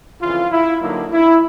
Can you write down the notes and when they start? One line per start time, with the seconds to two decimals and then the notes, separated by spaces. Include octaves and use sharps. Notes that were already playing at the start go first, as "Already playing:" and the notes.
0.21 F2 C#3 E3 F4
0.51 E4
0.81 G2 D3 F#3 A#3 D#4
1.12 E4